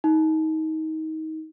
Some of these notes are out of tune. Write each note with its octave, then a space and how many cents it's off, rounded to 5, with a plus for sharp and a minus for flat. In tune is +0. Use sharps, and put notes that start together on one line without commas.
D#4 +25